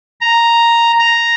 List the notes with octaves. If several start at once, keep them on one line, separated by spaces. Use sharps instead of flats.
A#5
A#5